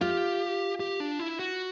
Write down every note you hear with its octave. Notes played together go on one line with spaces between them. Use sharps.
F4 G4
G4
D4
E4
F#4